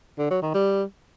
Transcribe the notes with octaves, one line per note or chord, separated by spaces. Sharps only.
D3
F#3
D#3
G3